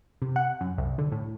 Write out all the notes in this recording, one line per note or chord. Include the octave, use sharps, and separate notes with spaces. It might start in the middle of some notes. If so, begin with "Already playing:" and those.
C3
F#5
F#2
C2
D3
A2